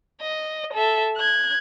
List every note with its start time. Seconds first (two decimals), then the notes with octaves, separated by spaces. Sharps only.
0.21 D#5
0.73 A4 E5
1.17 F#6 G#6